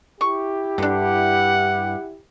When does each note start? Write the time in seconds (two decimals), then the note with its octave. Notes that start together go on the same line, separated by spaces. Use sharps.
0.21 E4 G4 C#6
0.78 G2 D3 D4 F#5